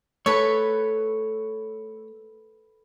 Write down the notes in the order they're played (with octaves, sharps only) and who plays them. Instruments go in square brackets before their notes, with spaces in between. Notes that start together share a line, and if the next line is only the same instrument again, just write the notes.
[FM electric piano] A3 [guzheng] A4 B4 [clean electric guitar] C#5